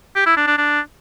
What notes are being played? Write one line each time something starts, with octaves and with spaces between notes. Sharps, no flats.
G4
E4
D4
D4
D4